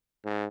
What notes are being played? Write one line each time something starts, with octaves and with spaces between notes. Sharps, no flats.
G#2